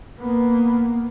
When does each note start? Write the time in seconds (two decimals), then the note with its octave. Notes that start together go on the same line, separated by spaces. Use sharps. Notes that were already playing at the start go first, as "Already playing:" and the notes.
0.20 A#3 B3